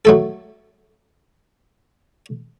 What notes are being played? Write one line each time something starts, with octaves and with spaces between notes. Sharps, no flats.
F#3 A3 A4